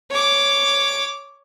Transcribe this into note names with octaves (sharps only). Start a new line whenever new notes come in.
C#5 D6